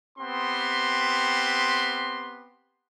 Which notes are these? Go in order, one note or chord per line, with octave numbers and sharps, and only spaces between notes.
B3 C4 G4 C6